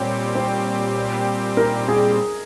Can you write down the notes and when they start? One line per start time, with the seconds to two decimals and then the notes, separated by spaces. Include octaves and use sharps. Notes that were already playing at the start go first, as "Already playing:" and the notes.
Already playing: A#2 G3 C4 G4 C#5
0.35 C5
1.57 A#4
1.88 G#4